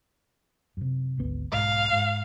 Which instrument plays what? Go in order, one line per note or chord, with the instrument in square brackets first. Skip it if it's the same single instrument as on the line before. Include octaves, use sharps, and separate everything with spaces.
[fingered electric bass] F#2 C3
G#1 D2 B3
[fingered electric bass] B1 G#2 [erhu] F5
[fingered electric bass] G#2